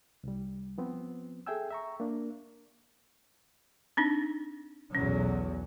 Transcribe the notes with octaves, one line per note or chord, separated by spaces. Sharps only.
C2 G3
F3 B3 C4
G#4 A4 E5 G5 G#5 E6
E5 A#5 C#6
A#3 D4
C4 D4 D#4
B1 E2 F#3 C#4